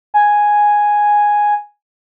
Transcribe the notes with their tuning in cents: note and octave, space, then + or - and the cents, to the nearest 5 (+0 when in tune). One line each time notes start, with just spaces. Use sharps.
G#5 +0